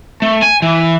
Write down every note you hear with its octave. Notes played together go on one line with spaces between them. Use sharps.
A3
G#5
E3